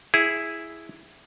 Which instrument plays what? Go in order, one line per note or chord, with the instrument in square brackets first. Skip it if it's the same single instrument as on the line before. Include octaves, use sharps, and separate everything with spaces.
[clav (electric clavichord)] E4 G#4